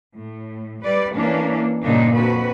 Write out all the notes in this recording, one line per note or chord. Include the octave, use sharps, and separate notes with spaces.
A2
G3 B4 D5
E3 A#3 C#4 D4
G2 A#2 C#3 D4 D#4
F2 D3 F#4 B4